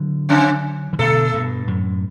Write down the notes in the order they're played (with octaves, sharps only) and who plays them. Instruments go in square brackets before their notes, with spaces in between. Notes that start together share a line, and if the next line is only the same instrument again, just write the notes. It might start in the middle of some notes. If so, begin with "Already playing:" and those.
Already playing: [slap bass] D3 F#3
[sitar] C#3 C#4
[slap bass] E3
[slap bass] B2 D3 [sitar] A3 A4
[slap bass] G2 B2
F#2 A2